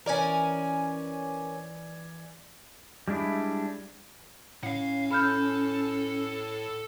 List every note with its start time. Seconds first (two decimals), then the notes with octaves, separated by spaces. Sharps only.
0.06 E3 C#4 A#4 D5 G#5
3.08 G3 G#3 D4 E4
4.63 A2 C#4 F5 F#5
5.11 A4 B5 F6 G6